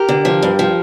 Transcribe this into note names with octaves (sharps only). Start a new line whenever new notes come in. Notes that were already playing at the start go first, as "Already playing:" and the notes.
Already playing: G4 A#4
D3
F3
G2
F3